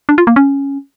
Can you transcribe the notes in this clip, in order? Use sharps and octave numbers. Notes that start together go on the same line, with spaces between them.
D4
F4
A#3
C#4